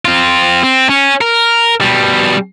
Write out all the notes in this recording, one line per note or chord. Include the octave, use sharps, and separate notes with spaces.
C4 F4
C4
C#4
A#4
B2 G3